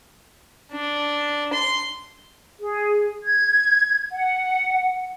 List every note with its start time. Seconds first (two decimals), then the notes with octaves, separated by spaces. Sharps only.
0.72 D4
1.53 C6
2.60 G#4
3.24 G#6
4.12 F#5